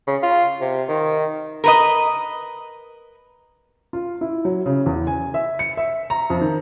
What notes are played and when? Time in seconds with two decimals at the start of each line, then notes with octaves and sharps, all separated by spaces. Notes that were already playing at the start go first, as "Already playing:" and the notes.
0.07 C#3
0.23 F4
0.61 C3
0.88 D#3
1.64 A#4 B4 D#5
3.93 F4
4.21 E4
4.45 F#3
4.66 C#3
4.86 E2
5.07 G#5
5.34 E5
5.59 C#7
5.77 E5
6.10 A#5
6.30 F2
6.41 D#3